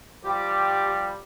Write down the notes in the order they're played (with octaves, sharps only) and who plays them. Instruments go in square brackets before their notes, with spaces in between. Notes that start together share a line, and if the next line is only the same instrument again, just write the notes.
[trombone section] F3 G3 [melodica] G4